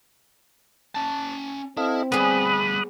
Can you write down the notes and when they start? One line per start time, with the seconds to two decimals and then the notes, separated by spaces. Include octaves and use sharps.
0.95 C#4 A5
1.77 C4 E4 A4 D#5 F5
2.12 D2 G3 B3 G#4 B5 D#6 F#6